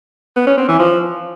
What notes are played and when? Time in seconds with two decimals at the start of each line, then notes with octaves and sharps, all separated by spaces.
0.36 B3
0.47 C#4
0.58 C4
0.68 E3
0.79 F3